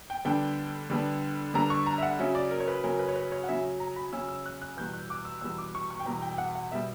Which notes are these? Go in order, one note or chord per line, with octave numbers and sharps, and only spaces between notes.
G5
D3 G3 B3 D4 G5
D3 G3 B3 D4
D3 G3 B3 D4 A#5
C#6
A#5
E5
F#5
C#3 F#3 C#4 E5
D5
A#4
C#5
B4
C#3 F#3 C#4 A#4
B4
C#5
B4
C#5
F#5
C#3 F#3 C#4 E5
A#5
B5
C#3 F#3 C#4 E6
E6
F#6
F#6
E2 B2 G3 G6
F#6
D6
E6
E2 B2 G3 E6
D6
C#6
C#6
G5
E2 B2 G3 A#5
G5
G5
F#5
F#5
B2 G3 E5